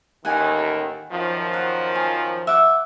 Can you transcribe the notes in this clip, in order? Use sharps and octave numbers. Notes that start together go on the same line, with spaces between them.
A1 D#2 D#3 F#5 G#5
F#2 D#3 F3
F#5
G#5
E5 F#5 D6